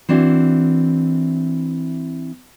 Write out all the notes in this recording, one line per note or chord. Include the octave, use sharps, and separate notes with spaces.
E3 C4 D4 E4 F#4